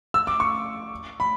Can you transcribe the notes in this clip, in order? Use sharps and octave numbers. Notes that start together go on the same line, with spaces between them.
E6
D6
C#6
B5